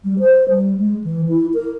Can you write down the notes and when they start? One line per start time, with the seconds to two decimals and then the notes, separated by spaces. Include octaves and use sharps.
0.04 G3
0.20 C5
0.50 G3
0.77 G#3
1.04 E3
1.29 E4
1.54 A#4